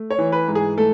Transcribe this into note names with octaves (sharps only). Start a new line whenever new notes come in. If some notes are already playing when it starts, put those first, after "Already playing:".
Already playing: A3
C#5
E3
B4
G#2
G#4
A3 A4